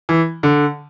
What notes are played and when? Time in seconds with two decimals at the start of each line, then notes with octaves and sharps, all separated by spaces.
0.09 E3
0.43 D3